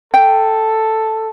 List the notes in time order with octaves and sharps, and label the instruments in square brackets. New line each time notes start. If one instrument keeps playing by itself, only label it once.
[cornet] A4 [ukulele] G5